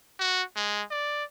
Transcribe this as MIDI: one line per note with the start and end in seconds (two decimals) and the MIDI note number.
0.19 0.42 66
0.56 0.82 56
0.90 1.24 74